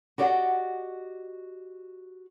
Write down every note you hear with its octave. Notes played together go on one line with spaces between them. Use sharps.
F#4 G4 D5 D#5 F5 F#5